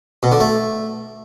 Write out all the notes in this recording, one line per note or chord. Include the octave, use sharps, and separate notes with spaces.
B2
D3
A3